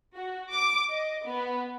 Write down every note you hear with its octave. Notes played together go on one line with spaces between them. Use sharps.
F#4
D6
D#5
B3